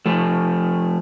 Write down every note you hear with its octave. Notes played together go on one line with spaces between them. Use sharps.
F3 A3